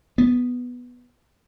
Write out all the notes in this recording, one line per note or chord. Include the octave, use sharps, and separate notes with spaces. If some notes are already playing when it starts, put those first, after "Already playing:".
B3